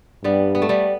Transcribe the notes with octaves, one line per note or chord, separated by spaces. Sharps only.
G2 G3 B3
B3
A3
G3 B3